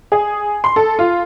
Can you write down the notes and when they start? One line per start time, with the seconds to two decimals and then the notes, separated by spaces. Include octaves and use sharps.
0.12 G#4
0.64 C6
0.76 A4
0.99 F4